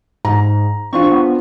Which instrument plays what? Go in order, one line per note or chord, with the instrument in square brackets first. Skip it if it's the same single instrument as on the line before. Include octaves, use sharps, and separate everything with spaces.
[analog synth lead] G#2 [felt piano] A#5
[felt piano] C4 D4 F4 [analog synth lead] C#6
[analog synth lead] B3